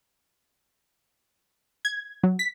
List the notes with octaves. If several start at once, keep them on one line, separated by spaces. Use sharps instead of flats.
G#6
F#3
B6